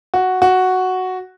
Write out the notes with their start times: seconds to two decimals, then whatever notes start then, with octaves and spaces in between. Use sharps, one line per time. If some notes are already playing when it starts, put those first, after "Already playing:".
0.14 F#4
0.42 F#4